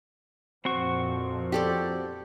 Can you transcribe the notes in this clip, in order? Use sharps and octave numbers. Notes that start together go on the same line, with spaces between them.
F2 A#2 F3 C4 F#4 C#6
G4 A4 D5